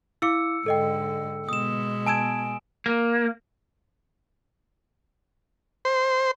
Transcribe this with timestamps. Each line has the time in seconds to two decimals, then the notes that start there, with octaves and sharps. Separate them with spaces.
0.22 E4 F5 D6 E6 C#7
0.66 G#2 D3 A4 D#5 G5
1.49 B2 G#3 B3 D#6 E7
2.07 G#5 A5 E6 G#6 D7 E7
2.86 A#3
5.85 C5